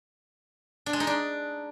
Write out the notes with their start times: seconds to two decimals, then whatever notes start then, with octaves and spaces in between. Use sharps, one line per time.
0.86 D4
0.93 G#3
1.00 D#4
1.07 D4